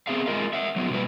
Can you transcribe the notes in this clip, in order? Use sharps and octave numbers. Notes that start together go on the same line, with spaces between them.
B3 C4 G#4 E5 F5
G#3 A3 F4 A#4 D#5 F5
E5 F#5
F#3 B3 F4
B2 G3 A#3 F4 B4